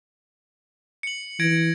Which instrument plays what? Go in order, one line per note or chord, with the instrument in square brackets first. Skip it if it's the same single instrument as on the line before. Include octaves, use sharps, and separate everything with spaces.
[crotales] C#7 F#7
[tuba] E3 [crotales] G#6 A#6 D7